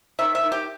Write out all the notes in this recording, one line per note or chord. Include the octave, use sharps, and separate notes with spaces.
D#3 E5
E5
D#3
G4